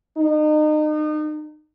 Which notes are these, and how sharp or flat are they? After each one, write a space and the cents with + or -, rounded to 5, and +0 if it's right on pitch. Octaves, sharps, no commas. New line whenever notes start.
D#4 -35